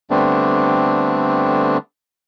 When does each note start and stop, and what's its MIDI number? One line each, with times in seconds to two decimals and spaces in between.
0.11 1.78 50
0.11 1.78 55
0.11 1.78 57
0.11 1.78 59
0.11 1.78 60
0.11 1.78 62